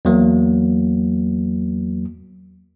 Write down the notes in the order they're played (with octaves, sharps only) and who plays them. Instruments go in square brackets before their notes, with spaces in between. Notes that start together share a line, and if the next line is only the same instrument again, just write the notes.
[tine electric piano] E2 F#3 A#3